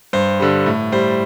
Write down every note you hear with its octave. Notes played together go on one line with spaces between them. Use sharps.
G2 C5
D3 G3
A2
G3 C5